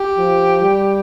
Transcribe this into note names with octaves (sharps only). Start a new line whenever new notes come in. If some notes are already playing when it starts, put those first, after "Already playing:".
Already playing: G4
F3
G3